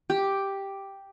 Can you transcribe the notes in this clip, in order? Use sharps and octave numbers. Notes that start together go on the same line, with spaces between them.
G4